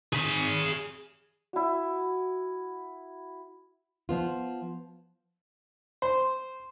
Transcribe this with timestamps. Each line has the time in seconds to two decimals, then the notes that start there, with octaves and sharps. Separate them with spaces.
0.13 G#4 B5
1.53 E4 F#4
4.09 F3 B3 F4
6.02 C5